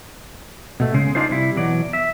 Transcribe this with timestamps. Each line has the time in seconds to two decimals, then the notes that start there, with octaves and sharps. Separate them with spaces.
0.80 B2 A3
0.94 C#3 G#3 G#4
1.15 D4 D#4 F4 G#4 C5
1.30 C3 G3 E4
1.56 B2 E3 F#3 D5
1.93 E5